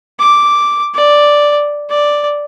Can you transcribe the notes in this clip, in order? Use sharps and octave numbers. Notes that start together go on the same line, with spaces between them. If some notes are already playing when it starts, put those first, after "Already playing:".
D6
D5
D5